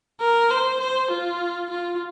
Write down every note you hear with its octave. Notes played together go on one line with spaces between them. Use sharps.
A#4
C5
C5
F4
F4